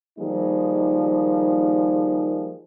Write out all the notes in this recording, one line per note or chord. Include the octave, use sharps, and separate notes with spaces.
D#3 F3 G3 A#3 D#4 G#4